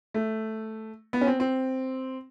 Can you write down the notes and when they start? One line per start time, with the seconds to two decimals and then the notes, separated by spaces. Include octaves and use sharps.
0.14 A3
1.13 B3
1.21 C#4
1.27 C4
1.40 C4